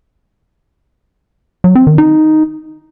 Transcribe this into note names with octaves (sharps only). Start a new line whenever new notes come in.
F#3
C4
D#3
D#4